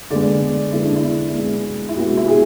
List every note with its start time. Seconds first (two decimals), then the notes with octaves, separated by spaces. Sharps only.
0.10 D3 G#3 B3 D5
0.72 D3 G#3 B3 E4
0.84 D4
0.96 E4
1.35 B2 G#3 B3
1.89 E4
1.96 B2 G#3 B3 F#4
2.17 E4
2.28 G#4